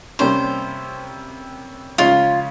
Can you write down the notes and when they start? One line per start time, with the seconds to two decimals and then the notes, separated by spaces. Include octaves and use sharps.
0.19 C3 G3 A#3 C#4 C5
1.98 C#3 F3 G#3 C#4 F4